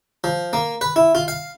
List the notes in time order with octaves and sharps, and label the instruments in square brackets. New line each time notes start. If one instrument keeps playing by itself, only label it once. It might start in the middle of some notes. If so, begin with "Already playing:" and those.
[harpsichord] F3
A#3
B4
E4
F4
F5